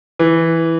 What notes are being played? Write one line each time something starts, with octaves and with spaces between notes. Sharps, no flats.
E3